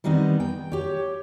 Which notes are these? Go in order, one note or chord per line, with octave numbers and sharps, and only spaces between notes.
D#3 G3 B3 C4 D#4
G5
G4 C#5